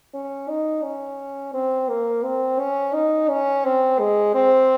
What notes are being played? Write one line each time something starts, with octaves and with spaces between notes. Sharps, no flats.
C#4
D#4
C#4
C4
A#3
C4
C#4
D#4
C#4
C4
G#3
C4